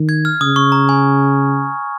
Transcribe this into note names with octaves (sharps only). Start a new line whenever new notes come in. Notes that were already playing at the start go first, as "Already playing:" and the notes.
Already playing: D#3
G#6
F6
C#3 D#6
C#6
A#5
G#5